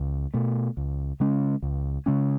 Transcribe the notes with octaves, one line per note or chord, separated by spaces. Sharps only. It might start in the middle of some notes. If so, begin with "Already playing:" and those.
Already playing: C#2
B2 A3
C#2
C#3 G#3 C#4
C#2
C#3 G#3 C#4